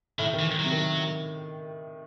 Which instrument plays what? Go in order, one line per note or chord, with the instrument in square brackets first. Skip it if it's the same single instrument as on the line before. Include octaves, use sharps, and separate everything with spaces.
[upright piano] A2 [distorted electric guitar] D#3
[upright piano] D#3
[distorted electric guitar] E3
[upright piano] D#3
[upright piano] C3 [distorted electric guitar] F#3
[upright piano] D#3
C3